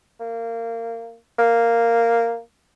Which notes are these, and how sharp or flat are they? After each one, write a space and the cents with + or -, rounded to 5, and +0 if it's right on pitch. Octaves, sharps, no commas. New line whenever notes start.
A#3 -20
A#3 -5